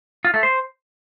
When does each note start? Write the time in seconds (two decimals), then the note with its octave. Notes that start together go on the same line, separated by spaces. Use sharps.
0.25 F4
0.34 A3
0.43 C5